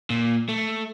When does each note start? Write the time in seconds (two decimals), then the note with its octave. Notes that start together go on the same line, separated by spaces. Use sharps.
0.10 A#2
0.49 A3